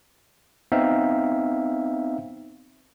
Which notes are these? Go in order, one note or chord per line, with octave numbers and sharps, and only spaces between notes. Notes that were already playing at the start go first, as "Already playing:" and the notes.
B3 C4 D#4 E5 F5